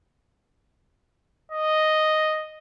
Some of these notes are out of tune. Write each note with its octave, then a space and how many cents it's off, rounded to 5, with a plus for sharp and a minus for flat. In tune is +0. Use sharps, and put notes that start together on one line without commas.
D#5 +0